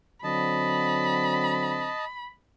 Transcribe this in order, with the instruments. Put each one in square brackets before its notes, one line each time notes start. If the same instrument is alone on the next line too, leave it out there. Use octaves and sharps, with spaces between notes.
[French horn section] D3 F#3 C4 [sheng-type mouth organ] D#5 A5 [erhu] B5